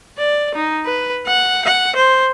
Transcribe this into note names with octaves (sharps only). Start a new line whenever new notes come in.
D5
D#4
B4
F#5
F#5
C5